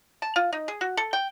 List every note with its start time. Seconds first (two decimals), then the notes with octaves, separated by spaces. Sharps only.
0.22 A5
0.36 F4
0.53 D#4
0.68 G#4
0.81 F#4
0.97 A4
1.13 G5